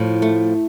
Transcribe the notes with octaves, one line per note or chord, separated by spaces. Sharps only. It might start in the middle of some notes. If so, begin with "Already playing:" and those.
Already playing: A2 F3
A3